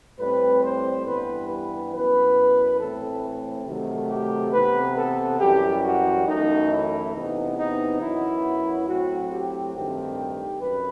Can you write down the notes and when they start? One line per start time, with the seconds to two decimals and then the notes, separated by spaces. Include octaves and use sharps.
0.19 A2 G3 C4 B4
0.63 C5
1.06 G2 E3 G3 B3 B4
1.49 B4
1.92 F#2 E3 B3 B4
2.80 A2 E3 A3 C4 A4
3.66 C3 D#3 F#3 A3
4.10 G4
4.53 C3 E3 B3 B4
4.96 A4
5.40 F#2 E3 G3 G4
5.84 F#4
6.26 F#2 E3 A3 D#4
6.70 E4
7.14 E2 C3 E3 B3 D#4
7.58 D#4
8.00 F#2 F#3 B3 E4
8.87 A2 F#3 C4 F#4
9.31 G4
9.74 G2 D#3 A3 C4 G4
10.61 F#2 B4